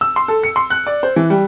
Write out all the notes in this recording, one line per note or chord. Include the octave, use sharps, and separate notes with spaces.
E6
C6
A4
C#7
C6
F#6
D5
C5
E3
G3